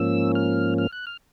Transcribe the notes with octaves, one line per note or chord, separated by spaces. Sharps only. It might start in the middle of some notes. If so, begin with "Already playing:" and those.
Already playing: G#2 F3 A#3 C#4 E6
F6
F6
F#6
F6